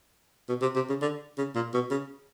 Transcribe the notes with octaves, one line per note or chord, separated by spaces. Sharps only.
B2
C3
C3
C#3
D3
C#3
A#2
B2
C#3